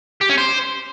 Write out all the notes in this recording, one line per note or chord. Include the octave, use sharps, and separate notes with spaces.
G4
C#4
C5